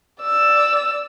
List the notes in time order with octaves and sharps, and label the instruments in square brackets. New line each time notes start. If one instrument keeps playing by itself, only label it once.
[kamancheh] D5 E6